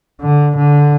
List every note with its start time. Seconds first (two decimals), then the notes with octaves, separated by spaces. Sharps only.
0.21 D3
0.57 D3